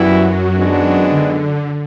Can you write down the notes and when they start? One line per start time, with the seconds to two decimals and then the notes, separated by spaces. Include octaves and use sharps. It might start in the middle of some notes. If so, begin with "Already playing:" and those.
Already playing: F#2 E3 F#3 G3 B3 E4
0.57 D#3 G#3 B3 D4
1.10 D3